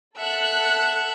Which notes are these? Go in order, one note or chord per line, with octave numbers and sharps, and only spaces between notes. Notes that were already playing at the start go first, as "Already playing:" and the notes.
A4 E5 F#5 F#6